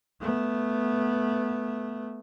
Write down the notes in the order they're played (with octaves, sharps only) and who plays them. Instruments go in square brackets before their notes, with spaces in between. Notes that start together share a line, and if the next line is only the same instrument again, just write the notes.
[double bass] A3 B3